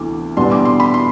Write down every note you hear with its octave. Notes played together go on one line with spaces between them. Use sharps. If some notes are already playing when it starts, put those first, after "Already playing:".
Already playing: D2 C3 E3 B3 D6
E2 B2 G3 B3 D4 C6
D6
C6
B5
C6